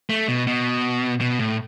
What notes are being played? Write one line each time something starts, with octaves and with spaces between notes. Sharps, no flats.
A3
B2
B2
B2
A2